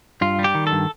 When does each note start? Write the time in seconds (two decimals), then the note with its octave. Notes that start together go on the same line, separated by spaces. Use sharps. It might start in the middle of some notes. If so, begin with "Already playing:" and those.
0.21 G2 F4
0.39 G3
0.44 G4
0.55 D#3
0.67 A4
0.72 G2